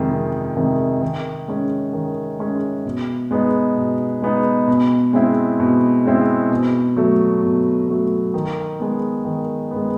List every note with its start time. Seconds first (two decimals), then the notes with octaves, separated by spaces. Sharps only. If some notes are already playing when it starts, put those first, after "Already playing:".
Already playing: F2 C3 D#3 G#3
0.11 F2
0.57 C3 D#3 G#3
1.02 D#3
1.48 G#3 C#4
1.93 D#3
2.39 G#3 C#4
2.85 B2
3.31 G#3 B3 D#4
3.77 B2
4.22 G#3 B3 D#4
4.68 B2
5.13 G#3 C4 E4
5.60 B2
6.05 G#3 C4 E4
6.50 B2
6.96 F#3 A3
7.42 B2
7.88 F#3 A3
8.34 D#3
8.80 G#3 B3
9.25 D#3
9.71 B3
9.76 G#3